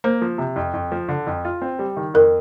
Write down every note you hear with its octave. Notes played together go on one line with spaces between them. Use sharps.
A#3 C5
F3
C3
F2
F2
F3
D3
F2
F4
C4
G3
D#3
F2 A#4